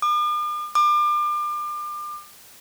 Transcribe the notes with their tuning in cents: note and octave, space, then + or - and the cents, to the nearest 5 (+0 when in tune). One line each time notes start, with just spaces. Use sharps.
D6 +45
D6 +35